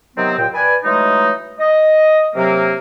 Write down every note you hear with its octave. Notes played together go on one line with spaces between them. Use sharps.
C3 D#3 F#3 B3 C4
D#2 A#2 G5
B4 D5 G#5
E3 F#3 G#3 A3 D#4
D#5
C3 F#3 A#3